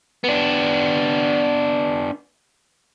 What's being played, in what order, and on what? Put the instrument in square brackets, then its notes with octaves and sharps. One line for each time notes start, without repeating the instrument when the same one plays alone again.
[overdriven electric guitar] B3 D4